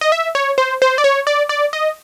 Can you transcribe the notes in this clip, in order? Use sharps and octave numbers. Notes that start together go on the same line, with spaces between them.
D#5
E5
C#5
C5
C5
D5
C#5
D5
D5
D#5